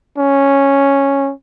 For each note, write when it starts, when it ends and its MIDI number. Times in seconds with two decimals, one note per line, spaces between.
0.18 1.32 61